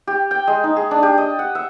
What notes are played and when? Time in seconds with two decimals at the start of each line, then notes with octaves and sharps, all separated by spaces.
0.07 G4
0.31 G5
0.47 G#3
0.64 D#4
0.76 G#4
0.91 D4
1.03 G4
1.18 D#5
1.39 F#5
1.55 E5